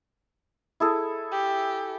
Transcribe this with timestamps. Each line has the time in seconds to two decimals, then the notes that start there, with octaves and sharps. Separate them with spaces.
0.80 E4 G#4 A4
1.32 G4